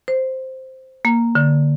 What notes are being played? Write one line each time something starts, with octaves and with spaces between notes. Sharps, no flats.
C5
A#3
D3